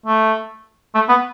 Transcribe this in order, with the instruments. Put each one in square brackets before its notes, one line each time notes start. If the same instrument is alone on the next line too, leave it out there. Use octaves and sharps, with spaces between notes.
[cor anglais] A3
A3
B3